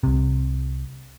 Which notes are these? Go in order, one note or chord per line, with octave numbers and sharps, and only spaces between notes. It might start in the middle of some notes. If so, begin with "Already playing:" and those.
C2 C3